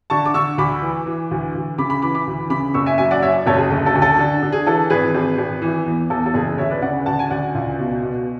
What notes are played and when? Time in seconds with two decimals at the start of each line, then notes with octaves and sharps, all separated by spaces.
0.10 D3 A5 C#6
0.26 D6
0.34 D3 C#6 E6
0.58 D2 B5 D6
0.82 E3
1.06 E3
1.31 D2
1.55 D2
1.78 C#3 B5 D6
1.90 B5 D6
2.02 E3 B5 D6
2.14 B5 D6
2.27 D2
2.50 C#3 B5 D6
2.74 F#1 C#6 E6
2.86 E5 G#5
2.98 F#2 E5 G#5
3.11 D5 F#5
3.22 F#2 C#5 E5
3.46 F#1 A4 C#5
3.58 G#4
3.70 D2 A4
3.86 A4
3.95 D2
4.02 A4
4.19 D3
4.42 D3
4.52 G#4
4.66 E3 A4
4.90 G#1 G#4 B4
5.14 G#1
5.38 G#1
5.62 E3
5.86 E2
6.10 E2 A4
6.26 A4
6.34 F#1 G#4
6.58 D2 C#5 E5
6.70 B4 D5
6.82 C#3 D5 F#5
7.06 D2 F#5 A5
7.19 G#5
7.30 D2 D5 F#5
7.55 C#2
7.79 B2
8.02 B2